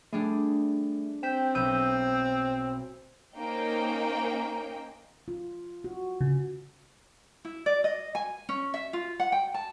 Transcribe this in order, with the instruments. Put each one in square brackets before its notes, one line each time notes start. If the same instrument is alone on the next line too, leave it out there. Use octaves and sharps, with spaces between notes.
[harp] G3 D4 G#4 [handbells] A3
[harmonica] C4 [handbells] G5 [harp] G6 B6 E7
[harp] B1 G6 D#7 [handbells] E6
[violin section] A#3 C#4 D#4 C5 G5
[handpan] F4
F#4
[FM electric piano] C#3
[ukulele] E4
D5
D#5
G#5
C#4
E5
F4
F#5
G5
A5